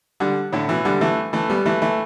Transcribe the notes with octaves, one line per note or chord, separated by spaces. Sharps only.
D3 G3
A2 D3
B2 E3
D3 G3
E3 A3
E3 A3
G3 B3
E3 A3
E3 A3